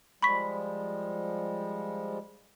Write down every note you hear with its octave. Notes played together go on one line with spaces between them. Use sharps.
F3 G3 G#3 B5 C#6 B6